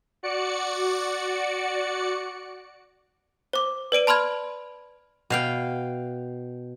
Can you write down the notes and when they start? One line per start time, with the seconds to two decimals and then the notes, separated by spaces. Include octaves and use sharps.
0.23 F#4 D5 C#7
3.53 C5 D6
3.92 B4 D5 D7 D#7
4.07 A5 B5 C6 F6 G#6
5.30 B2 F5 G5